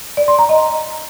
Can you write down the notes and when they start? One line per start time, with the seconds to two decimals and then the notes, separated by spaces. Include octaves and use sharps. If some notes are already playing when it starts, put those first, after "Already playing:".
0.17 D5
0.28 C6
0.39 A#5
0.49 D#5